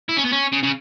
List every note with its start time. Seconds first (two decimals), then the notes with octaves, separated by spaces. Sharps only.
0.09 E4
0.17 C#4
0.25 B3
0.33 C#4
0.53 C#3
0.63 C#3